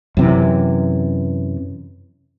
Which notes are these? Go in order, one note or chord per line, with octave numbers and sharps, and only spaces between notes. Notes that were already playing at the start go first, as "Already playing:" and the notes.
F#2 C3 E3